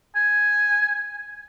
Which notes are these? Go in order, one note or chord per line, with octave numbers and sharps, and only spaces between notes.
G#5